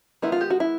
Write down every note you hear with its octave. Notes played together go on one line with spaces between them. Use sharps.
D#3 G#3 B3 E4
F4
G4
F#4
E4